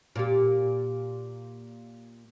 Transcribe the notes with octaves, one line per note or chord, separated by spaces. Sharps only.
A#2 G4